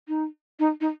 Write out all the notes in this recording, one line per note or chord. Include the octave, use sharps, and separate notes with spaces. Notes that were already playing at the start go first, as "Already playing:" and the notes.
D#4
D#4
D#4